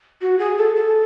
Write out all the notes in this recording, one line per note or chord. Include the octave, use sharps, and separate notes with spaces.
F#4
G#4
A4
A4